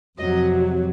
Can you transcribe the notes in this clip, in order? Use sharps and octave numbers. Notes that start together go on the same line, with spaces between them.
F2 C3 F#3 D#5